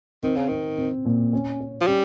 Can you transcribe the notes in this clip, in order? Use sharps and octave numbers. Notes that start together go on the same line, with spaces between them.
D#3 C4
C#3
D#3 C4
C4
A#2
C#4
C#4
F3
G3 C#4